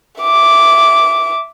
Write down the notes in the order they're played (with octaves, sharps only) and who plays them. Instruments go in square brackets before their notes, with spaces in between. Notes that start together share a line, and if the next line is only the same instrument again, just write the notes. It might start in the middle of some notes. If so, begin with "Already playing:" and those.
[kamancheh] E5 D6